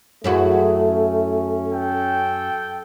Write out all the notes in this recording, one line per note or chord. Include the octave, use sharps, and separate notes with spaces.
F#2 A3 E4 F#4 G#4
C#4
A4 G5